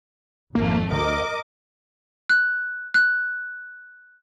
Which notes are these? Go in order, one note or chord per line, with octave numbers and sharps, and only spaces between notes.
G#1 F2 A3 A#3
D2 A#4 D#5 D6
F#6
F#6